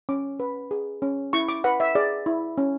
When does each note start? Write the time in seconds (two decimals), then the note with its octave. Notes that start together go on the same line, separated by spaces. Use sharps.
0.09 C#4 D6
0.40 B4
0.71 G#4
1.02 C#4
1.33 E4 C#6
1.49 D6
1.64 B4 F#5
1.80 E5
1.95 G#4 D5
2.26 E4
2.58 C#4